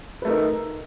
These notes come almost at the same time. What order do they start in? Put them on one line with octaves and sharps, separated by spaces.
B4 A3 A#4 D#4